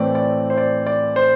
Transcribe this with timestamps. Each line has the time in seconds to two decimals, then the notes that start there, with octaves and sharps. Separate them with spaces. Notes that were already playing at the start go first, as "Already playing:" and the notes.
Already playing: A2 E3 A3 C4 D5
0.15 D5
0.50 C5
0.58 D5
0.86 D5
1.16 C5